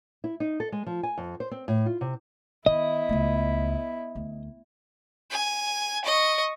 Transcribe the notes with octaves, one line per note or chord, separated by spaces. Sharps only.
E4
D#4
A4
G#3
F3
G#5
F2
C5
C4
A2
F4
C3
D#3 B3 E4 D#5
C#2 A3
D2
G#5
D#5 C#6